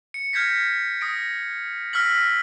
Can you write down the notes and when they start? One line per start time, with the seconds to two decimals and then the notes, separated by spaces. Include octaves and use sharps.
0.14 C#7
0.33 F6 G6 G#6 A#6 B6
1.01 D#6 A#6 D7
1.93 E6 F6 A#6 B6 F#7